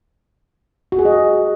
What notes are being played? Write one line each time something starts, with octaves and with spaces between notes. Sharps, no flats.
F#4
G#4
D#5